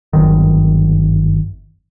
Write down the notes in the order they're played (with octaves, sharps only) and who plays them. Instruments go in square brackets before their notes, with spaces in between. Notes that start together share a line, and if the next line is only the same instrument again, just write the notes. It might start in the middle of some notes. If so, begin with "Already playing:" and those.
[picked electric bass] G1 F#2 D#3